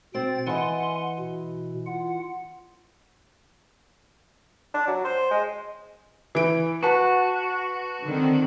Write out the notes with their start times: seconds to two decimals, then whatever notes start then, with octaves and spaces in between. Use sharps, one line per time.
0.14 B2 C4 G5 A6
0.47 E3 D#5 F#5 G#5 C6
1.19 B2
1.86 F4 F#5
4.74 D4
4.87 F#3
5.05 C5
5.31 G#3
6.35 E3 D7
6.83 F#4 B4 A5
8.03 D3 D#3 C4